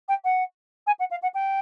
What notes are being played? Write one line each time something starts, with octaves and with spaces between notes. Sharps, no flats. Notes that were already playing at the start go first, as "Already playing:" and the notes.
G5
F#5
G#5
F#5
F5
F#5
G5